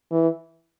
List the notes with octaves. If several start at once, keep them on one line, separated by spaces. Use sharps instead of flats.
E3